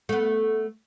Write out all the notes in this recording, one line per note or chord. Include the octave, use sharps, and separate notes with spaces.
A3 B3